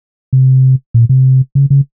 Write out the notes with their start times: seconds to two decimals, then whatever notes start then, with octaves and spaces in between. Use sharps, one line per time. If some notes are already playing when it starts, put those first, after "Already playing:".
0.33 C3
0.94 A#2
1.09 C3
1.55 C#3
1.70 C#3